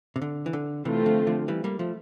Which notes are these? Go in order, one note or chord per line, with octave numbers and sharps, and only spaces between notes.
C3
D3
E3
D3
C3 E3 A3 C4 F4
D3 F3
D3 F3
E3 G3
G3 A#3
F3 A3